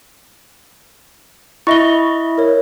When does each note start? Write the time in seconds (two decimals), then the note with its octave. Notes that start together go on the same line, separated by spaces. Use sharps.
1.67 E4 D#5 E5 C#6 A#6 G7
2.38 A#4 C#5